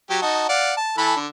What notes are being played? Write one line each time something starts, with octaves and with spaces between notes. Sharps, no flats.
F#3 G4
D#4 F#4 A5
D5 F5 F#5
A5
E3 A4 B5
D3